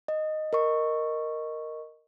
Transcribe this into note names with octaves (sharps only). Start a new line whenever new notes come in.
D#5
A#4 D#5 C#6